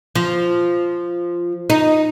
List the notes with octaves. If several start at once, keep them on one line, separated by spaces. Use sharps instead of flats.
F3
D#4